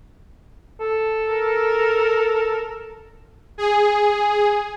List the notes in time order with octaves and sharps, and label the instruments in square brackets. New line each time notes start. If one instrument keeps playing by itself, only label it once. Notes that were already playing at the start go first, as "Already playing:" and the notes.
[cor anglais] A4
[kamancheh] A#4
[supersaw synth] G#4